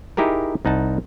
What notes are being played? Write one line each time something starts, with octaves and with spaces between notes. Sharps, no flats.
D#4 E4 G4 G#4 A#4
C2 D#4 F#5 A5